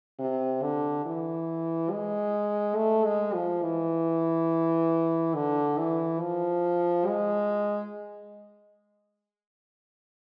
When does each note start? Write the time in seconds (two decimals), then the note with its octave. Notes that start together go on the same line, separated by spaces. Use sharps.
0.19 C3
0.62 D3
1.06 E3
1.91 G#3
2.76 A3
3.05 G#3
3.34 F3
3.63 E3
5.35 D3
5.78 E3
6.20 F3
7.07 G#3